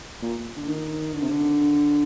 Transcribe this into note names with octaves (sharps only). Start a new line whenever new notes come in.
A#2
D3
D#3
D3
C3
D3